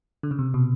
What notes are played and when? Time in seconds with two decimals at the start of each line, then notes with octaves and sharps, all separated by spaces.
0.23 D3
0.31 C#3
0.39 C3
0.54 B2